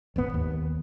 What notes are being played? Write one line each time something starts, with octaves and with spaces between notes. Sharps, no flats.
D#1 G#1 B3
D#2